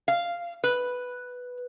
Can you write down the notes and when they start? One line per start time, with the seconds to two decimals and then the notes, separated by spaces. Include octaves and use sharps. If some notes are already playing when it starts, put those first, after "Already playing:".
0.08 F5
0.64 B4